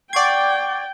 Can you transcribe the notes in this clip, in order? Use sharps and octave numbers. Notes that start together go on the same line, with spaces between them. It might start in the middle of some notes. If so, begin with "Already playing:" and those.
D5 F#5 G5 C#6 G#6 C7